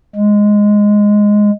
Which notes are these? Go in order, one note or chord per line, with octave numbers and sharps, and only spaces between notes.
G#3